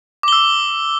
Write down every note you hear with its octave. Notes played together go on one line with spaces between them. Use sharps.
D6 E6 G7